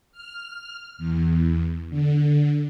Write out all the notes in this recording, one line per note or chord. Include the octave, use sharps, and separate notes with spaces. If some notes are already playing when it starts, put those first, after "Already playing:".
F6
E2
D3